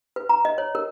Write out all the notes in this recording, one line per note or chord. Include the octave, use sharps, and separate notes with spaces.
B4
A#5
D#5
C#5
A#4